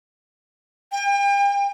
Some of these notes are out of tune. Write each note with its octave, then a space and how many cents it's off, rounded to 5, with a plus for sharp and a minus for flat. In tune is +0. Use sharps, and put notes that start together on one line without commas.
G5 +40